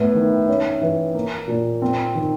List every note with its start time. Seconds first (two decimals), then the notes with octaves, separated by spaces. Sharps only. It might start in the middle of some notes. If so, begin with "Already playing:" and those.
Already playing: A2 B3
0.15 D#3
0.48 C#4
0.81 E3
1.14 A#3
1.48 A#2
1.82 C4
2.15 D#3